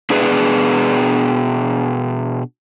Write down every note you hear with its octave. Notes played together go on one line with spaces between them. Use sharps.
B2 D4 G#4 B4 D5